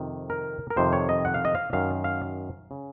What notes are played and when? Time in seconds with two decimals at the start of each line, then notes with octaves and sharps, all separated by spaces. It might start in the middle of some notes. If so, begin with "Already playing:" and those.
Already playing: F2 C3 D#3
0.30 A#4
0.70 A#4
0.76 F2 C3 D#3 C5
0.93 C#5
1.09 D#5
1.25 F#5
1.34 F5
1.45 D#5
1.55 F5
1.73 F#2 D#3 F5
2.04 F5
2.71 C#3